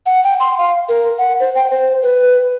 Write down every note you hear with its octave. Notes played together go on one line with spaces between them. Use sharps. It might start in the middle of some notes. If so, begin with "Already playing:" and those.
F#5
G5
C6
F5
A#4
F#5
C5
G5
C5
B4